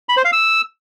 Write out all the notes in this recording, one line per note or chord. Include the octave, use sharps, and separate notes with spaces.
B5
C5
F5
E6